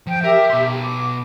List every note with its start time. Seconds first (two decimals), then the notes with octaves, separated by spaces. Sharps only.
0.07 F3 G5
0.24 G4 A#4 E5
0.50 B2 C6
0.81 D6